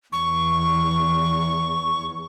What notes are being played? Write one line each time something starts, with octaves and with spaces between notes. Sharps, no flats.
E2 C#6